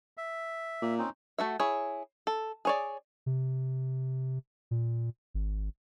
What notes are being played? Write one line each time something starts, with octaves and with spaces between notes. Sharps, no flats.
E5
A#2
C4 C#4 D#4
A3 F#4 E5
E4 G#4 C#5
A4
G#4 C#5 D5
C3
A#2
G#1